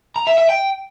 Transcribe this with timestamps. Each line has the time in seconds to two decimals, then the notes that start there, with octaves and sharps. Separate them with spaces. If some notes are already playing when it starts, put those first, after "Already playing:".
0.16 A#5
0.27 E5
0.38 E5
0.49 G5